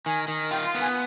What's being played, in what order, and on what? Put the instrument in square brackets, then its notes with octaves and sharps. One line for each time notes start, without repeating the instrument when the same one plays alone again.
[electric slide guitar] D#3 [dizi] G#5
[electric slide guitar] D#3
[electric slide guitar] F4 [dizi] G5
[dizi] C6
[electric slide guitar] B3
[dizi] G#5